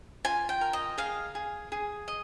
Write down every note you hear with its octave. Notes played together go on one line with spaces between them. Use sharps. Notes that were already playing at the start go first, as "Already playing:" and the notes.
F4 G#5
G5
A#4
D#5
G#4 F5
G#4
G#4
D#5